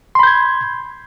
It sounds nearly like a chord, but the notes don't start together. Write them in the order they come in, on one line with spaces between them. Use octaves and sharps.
C6 B5 G6 G#6